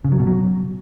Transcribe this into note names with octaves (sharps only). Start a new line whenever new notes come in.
C#3
F#3
B2
F#3